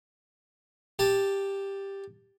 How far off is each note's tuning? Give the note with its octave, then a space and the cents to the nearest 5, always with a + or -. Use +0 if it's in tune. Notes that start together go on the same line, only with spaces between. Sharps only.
G4 +5 A5 +0